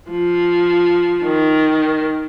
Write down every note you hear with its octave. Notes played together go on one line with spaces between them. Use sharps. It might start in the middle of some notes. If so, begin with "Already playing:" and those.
F3
D#3